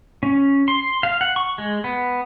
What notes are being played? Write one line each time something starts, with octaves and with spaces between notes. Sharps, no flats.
C#4
C6
F5
F#5
C#6
G#3
B3